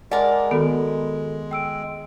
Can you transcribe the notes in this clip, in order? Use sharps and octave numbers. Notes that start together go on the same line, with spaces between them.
G#3 A#4 D5 F#5 G#5 A5
D#3 B3 F#4 A4
G5 E6 D7